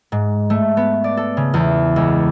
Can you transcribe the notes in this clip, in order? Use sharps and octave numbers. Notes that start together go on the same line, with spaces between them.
G#2
A3
B3
D5
A4
C#3
E2
C#2